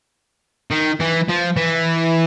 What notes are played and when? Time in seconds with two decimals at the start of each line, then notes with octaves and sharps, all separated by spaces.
0.71 D#3
1.00 E3
1.28 F3
1.56 E3